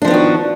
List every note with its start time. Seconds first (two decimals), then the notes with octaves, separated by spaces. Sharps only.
0.02 D4
0.05 F3
0.08 B3
0.11 D#3
0.14 F#4